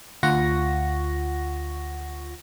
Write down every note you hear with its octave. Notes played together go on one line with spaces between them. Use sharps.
D2 F4 F#5 C#6 A#6